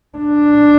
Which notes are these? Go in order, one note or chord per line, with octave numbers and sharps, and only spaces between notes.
D4